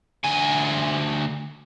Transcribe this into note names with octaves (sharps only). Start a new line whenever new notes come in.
D2 G#5